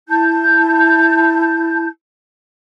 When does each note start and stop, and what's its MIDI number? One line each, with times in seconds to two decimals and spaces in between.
0.08 1.87 64
0.08 1.87 81
0.08 1.87 91